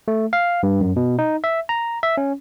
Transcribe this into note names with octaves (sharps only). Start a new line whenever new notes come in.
A3
F5
G2
F#2
B2
D#4
E5
A#5
E5
C#4